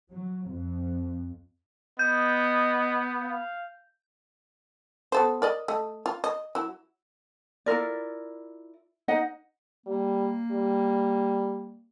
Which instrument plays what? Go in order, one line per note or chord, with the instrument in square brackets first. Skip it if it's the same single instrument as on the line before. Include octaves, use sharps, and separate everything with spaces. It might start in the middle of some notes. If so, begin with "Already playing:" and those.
[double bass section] F#3
F2
[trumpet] B3 [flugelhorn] D#5 [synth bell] G6
[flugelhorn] F5
[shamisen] B3 A4 C5
A#4 D5 D#5
A3 D#5
F4
D#5
F#3 E4
[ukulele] E4 F4 A#4 D5
D#4 D#5 F#5
[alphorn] G3 [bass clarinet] A#3
[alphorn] G3